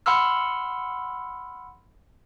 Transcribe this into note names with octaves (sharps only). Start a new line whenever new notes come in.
F#5 B5 C6 E6 F6